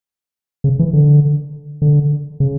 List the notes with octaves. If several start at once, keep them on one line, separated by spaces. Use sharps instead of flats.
C#3
E3
D3
D3
C#3